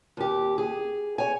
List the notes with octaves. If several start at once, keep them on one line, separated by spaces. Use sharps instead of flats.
D#2 G4
G#4
C#5 G#5